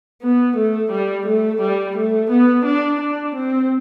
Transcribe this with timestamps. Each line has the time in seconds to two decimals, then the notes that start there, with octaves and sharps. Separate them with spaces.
0.22 B3
0.57 A3
0.91 G3
1.27 A3
1.61 G3
1.96 A3
2.31 B3
2.65 D4
3.01 D4
3.36 C4